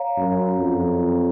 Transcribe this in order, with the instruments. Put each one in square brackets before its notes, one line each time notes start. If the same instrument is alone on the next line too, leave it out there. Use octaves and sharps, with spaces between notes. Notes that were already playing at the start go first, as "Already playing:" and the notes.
Already playing: [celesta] C#5 F5 A#5
[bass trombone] F#2
F2